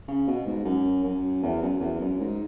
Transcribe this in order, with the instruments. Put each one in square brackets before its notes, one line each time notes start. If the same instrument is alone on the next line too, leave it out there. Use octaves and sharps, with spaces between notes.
[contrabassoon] C#3
B2
G#2
F#2
F#2
E2
F#2
E2
F#2
G#2